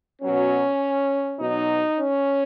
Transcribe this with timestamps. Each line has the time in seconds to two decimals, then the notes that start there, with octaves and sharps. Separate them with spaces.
0.21 B2 F#3 C#4
1.39 B2 F#3 D#4
1.98 C#4